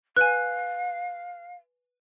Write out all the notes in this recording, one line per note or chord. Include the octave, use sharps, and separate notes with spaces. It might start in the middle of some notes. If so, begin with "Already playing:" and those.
B4 F5 G#5 F#6